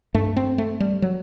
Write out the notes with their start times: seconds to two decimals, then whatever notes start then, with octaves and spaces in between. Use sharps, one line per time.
0.14 G2 A3
0.36 C4
0.58 A3
0.80 G3
1.02 F#3